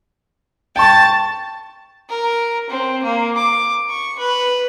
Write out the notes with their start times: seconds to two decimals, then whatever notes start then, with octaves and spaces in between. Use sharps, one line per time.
0.76 G5 A5 C#6 A6
2.09 A#4
2.70 C4
3.03 A#3
3.37 D6
3.89 C#6
4.19 B4